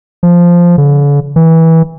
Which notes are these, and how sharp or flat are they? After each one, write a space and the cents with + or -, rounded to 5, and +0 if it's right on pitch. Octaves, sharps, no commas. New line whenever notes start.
F3 -5
D3 -45
E3 -20